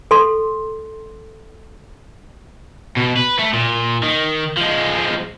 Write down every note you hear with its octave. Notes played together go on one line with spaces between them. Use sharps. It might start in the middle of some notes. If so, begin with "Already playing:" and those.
A4 C6
B2
B4
A3
A#2
D#3
F3 G#3